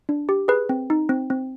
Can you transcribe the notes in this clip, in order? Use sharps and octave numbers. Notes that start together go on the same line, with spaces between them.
D4
G4
G#4 B4
C4
D#4
C4
C4